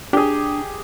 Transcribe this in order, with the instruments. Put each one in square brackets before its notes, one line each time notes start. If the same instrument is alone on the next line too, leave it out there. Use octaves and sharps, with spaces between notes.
[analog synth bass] D4 [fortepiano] G4 G#4